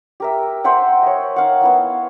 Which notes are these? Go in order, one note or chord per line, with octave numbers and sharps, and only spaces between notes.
G4 A#4 E5
C5 E5 F#5 G5
C#5 D#5
D#4 F5 F#5
B3 E4 F5